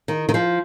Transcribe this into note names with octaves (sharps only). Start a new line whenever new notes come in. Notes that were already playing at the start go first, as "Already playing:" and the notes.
D#3
D#3
F3